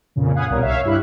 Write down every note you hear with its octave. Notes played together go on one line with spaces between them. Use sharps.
F2 A#2 C#3
F5 F#5 G#5 B5 D#6 F#6
C2 B2 G3 A#4 C#5
C#5 E5 F5
G2 E4 G4 B5 F#6